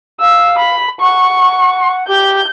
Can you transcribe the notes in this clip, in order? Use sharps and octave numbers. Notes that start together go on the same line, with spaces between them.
F5 E6
B5
F#5 C#6
G4 G6